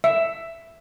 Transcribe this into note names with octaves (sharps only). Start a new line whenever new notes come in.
E5